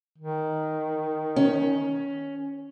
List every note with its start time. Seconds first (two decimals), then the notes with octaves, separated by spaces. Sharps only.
0.18 D#3
1.36 C#4